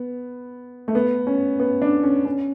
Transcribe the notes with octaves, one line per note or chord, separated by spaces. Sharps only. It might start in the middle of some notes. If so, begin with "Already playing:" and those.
Already playing: B3
A3
B3
C#4
B3
D4
C#4
C#4